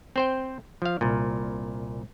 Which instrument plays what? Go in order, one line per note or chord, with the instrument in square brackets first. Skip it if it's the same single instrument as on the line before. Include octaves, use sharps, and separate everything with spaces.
[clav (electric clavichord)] C4 C5 G5
F3 F5
C2 A#2